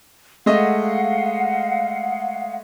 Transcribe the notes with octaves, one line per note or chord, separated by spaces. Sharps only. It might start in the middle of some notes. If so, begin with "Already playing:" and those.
G#3 A3 D#5 F5 F#5